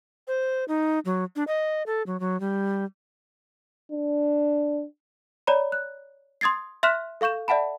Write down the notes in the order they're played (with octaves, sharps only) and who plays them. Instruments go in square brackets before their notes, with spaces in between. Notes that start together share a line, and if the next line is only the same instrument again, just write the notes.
[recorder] C5
D#4
F#3
D4
D#5
A4
F#3
F#3
G3
[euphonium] D4
[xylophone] C#5 D5 A#5 B5
F#6
C6 D#6 G#6 A6 C7
E5 C6 F6 F#6 B6 E7
A4 F5 C#6 G6 E7
D5 E5 F#5 A5 B5